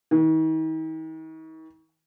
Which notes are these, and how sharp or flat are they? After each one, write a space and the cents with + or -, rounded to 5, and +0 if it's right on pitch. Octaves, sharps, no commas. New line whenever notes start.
D#3 +40